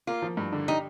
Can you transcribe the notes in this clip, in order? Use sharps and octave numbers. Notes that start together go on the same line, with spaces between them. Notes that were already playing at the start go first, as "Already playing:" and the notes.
A#3 F4
F3
G2
D3
D#4 G4